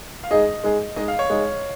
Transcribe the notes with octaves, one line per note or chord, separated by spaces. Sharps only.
F5
G#3 D#4 G#4 D#5
G#3 D#4 G#4
G#3 D#4 G#4 D#5
F5
C#5
G#3 D#4 G#4